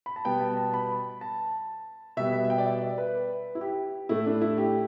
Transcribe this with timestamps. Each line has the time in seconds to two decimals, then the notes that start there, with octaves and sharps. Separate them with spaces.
0.06 B5
0.16 A5
0.25 B2 G3 B3 G5
0.41 A5
0.57 A5
0.74 B5
1.21 A5
2.17 B2 G3 B3 E5
2.33 E5
2.45 E5
2.50 G5
2.58 D5
2.66 E5
2.81 D5
2.98 B4
3.55 E4
3.61 G4
4.09 A2 A3 E4
4.26 D4
4.42 E4
4.58 G4